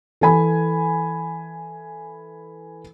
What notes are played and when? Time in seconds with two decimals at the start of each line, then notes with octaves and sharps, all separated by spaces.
0.21 E3 A4 G#5 B5